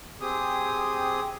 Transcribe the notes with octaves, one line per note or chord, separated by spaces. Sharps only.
C4 G4 G#4 D#6